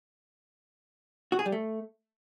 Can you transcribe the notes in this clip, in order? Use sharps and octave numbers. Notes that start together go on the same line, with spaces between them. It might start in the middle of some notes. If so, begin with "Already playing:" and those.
F#4
G#4
G3
A3